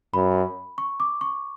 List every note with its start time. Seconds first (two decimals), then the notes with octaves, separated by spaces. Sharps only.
0.14 F#2 B5
0.78 C#6
1.00 D6
1.21 C#6